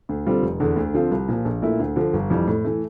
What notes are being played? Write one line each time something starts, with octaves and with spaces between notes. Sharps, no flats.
D2
D3 G3 C4 F4
F1
E2 D3
D2
D3 F3 C4 F4
C2
A#2 F3
A#1
A#2 A3 E4
D2
D3 F3
G1
F2 E3 G3
A2
E3 A3